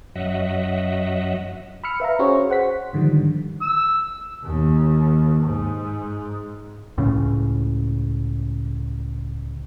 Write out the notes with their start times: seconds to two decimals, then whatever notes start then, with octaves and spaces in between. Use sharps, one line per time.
0.15 F#2 F#3 D#5 E5 F#5
1.84 B5 E6 F6 C#7
2.00 B4 E5 F5 A#5
2.19 C#4 F#4 G#4 C5 C#5 C#6
2.50 C5 F#5 B6
2.93 G#2 D3 D#3 F3 G3
3.62 E6
4.44 D#2
5.43 G#2
6.98 C#2 A2 C#3